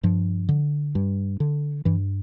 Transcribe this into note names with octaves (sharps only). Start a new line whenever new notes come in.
G2 F3
D3
G2
D3
G2 E3